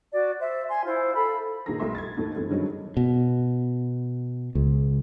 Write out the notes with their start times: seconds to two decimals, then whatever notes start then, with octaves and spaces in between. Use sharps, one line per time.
0.12 F#4 D5
0.40 C5 E5
0.68 G#5 C6
0.84 E4 F4 C5
1.14 A4 F5 B5
1.66 A#2 D#3 A#3 G#4 A#5 A#6
1.80 B1 G3 A3 E5 C6
1.95 G#6 A6
2.17 D#2 A2 D#3 A4
2.34 G2 E3 A3 C4
2.49 G2 D3 D#3 F#3 G#3 C#4
2.97 B2
4.55 C#2